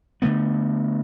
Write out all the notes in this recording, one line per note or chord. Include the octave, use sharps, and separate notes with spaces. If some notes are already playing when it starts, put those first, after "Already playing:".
D3 E3 A3 B3